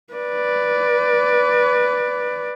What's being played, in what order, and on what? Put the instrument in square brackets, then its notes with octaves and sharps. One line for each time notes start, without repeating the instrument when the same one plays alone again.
[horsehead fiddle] B4 D5